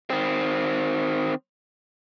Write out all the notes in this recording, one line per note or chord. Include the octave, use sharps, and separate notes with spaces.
D#3 C4